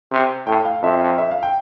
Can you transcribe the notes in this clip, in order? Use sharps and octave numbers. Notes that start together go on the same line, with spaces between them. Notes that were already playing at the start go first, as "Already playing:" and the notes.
C3
A2 G5
F5
F2 E5
E5
F5
G5